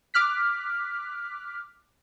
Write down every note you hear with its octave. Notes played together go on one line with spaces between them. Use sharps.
D6 F6 F#6 B6